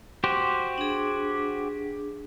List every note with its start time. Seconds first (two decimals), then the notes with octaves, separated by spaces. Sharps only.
0.24 F#4 G4 C5
0.78 D4 G#4